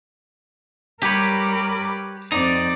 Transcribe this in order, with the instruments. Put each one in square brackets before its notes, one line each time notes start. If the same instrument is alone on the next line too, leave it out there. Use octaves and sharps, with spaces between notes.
[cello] G3 A#4 [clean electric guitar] G4 B4 C#5 [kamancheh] B5 D6
[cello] F2 C4 [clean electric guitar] D#4 [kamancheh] D5